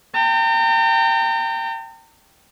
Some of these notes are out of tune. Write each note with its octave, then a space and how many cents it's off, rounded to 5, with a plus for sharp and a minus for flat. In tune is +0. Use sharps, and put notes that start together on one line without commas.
G5 +0 A#5 -40